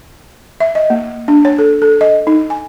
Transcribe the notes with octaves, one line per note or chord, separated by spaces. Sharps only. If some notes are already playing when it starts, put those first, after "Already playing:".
E5
D#5
A#3
D4
C#5
A4
A4
D#5
D#4
G#5